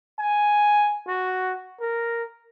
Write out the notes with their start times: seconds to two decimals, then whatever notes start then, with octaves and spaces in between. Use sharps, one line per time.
0.19 G#5
1.07 F#4
1.80 A#4